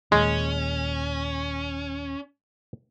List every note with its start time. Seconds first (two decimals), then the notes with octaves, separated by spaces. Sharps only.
0.12 D#1 D#2 A#2 G#3 C#4